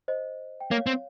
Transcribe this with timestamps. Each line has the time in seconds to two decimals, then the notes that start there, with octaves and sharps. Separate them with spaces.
0.08 C5 D#5
0.60 G5
0.71 A#3 C#5 F5
0.87 C4